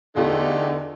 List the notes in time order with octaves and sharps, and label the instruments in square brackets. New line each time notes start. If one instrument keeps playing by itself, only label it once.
[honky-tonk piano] E2 F4 G4 [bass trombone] D3 [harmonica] A3 D#4